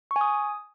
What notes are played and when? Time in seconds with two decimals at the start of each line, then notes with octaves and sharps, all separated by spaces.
0.11 C#6
0.16 G#5
0.21 D#6